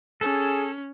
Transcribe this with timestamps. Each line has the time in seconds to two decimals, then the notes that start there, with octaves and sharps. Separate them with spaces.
0.21 C#4 G#4 A4